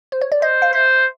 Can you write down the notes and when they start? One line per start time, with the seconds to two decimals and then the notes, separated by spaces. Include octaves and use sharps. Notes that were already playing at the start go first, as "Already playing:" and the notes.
0.12 C5
0.21 C#5
0.32 D5
0.42 C5 D#5
0.62 F5
0.73 C5 E5